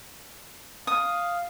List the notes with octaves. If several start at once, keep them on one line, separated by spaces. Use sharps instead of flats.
F5 D#6